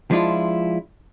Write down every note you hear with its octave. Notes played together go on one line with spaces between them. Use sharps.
F3 G#3 D4 E4 F4